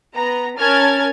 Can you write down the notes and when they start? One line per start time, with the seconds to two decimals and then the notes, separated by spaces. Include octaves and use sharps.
0.14 B3 A#5
0.59 C#4 A#4 A5 F6 G#6 A6